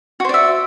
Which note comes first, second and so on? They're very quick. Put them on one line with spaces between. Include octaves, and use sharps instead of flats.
F#4 C5 D5 E5